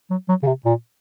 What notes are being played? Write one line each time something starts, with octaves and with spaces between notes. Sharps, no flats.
F#3
F#3
C#3
C3
A#2